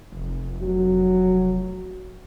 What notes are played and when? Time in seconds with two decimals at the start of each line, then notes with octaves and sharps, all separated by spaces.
0.12 F1
0.62 F#3